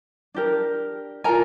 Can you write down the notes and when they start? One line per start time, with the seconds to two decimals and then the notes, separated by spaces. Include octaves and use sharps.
0.34 D4 G4 A#4
1.24 F4 A#4 G#5 A#5